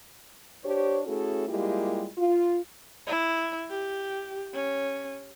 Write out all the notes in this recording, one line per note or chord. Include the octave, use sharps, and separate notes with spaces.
D4 G4 C5 C#5
A3 C#4 E4 F#4 G#4 A4
G3 G#3 A#3 E4 F4 G4
F4
E4
G4
C#4